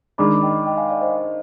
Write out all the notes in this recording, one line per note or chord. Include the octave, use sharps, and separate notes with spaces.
D#3 G#3 D4 B5 D6
D#5 G5
D#5 G5
F5 G#5
D5 F5
C5 D#5